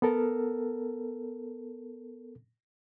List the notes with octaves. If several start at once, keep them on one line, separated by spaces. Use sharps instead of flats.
B3 A4 A#4